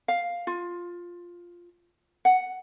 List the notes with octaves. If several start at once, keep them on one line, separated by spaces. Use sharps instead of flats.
F5
F4
F#5